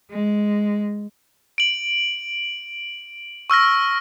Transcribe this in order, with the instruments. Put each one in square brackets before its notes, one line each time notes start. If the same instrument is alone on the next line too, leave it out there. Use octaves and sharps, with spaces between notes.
[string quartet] G#3
[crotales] D7 F#7
C#6 E6 F6 A#6